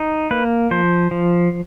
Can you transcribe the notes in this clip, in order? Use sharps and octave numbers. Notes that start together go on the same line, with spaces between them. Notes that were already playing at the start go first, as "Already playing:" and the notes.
Already playing: D#4
A#3 B4
F3 C5
F3